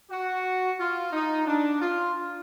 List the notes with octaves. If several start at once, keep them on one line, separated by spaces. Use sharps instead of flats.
F#4
F4
D#4
D4
F4